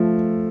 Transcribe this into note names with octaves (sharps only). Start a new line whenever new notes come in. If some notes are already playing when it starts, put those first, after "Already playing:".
Already playing: F3 A3